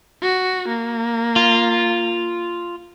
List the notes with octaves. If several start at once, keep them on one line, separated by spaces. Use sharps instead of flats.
F#4
A#3
F4